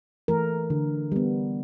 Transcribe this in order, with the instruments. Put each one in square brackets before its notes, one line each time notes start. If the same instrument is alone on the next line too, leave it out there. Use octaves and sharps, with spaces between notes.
[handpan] E3 A3 A#4
D3
G3 B3